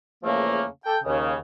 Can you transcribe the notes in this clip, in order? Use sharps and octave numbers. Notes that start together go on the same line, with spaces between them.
E2 C#3 F3 A3 A#3
A4 G5
D#2 C#3